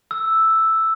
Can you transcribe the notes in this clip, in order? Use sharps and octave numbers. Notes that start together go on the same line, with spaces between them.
E6